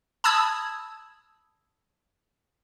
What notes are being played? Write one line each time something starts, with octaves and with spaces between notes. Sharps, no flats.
A5 B5 D#6 E6 G#6